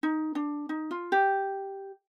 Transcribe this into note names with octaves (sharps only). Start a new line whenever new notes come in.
D#4
D4
D#4
F4
G4